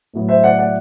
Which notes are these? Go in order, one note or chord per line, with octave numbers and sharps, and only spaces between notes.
A2 F#3 B3
C5 E5
D5 F#5
D5 F#5